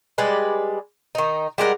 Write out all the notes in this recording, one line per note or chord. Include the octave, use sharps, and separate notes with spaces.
G3 G#3 B4 D5
D#3 D#4
G3 G#3 A#4 F#5